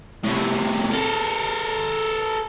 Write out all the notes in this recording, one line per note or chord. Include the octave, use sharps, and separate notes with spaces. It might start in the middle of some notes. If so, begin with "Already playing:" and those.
A2 C3
A4 A#4